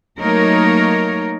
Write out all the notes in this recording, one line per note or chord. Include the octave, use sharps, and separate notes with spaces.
F#3 A3 A#3 D#4 A#4 C#5